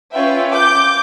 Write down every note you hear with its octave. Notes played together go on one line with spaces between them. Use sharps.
C#4 F4 B4 E5 G5
D6 G6